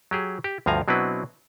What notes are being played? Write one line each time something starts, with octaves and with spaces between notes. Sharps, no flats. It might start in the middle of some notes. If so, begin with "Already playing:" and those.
F#3 G4 G#4
G4
D2 G2 F3 F5 G#5 A#5
B2 F#3 C4 D4 E4 B4